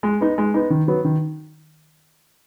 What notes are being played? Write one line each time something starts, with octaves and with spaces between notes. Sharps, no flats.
G#3
B3 D#4
G#3
B3 D#4
D#3
F#3 B3
D#3